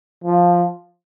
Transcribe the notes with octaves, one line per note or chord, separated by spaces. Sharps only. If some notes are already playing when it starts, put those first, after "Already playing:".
F3